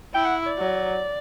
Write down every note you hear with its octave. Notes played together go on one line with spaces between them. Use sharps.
E4 G5
F#5
D5
F#3